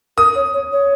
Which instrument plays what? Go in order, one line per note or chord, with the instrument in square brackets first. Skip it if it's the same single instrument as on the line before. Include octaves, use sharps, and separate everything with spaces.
[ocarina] A#4 [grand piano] D#6
[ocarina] C#5
C#5
C#5